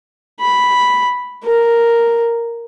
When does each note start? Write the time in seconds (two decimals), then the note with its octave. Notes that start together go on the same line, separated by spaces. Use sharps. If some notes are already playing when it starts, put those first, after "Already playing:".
0.41 B5
1.44 A#4